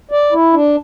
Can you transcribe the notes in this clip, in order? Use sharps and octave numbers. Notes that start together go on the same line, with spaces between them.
D5
E4
D4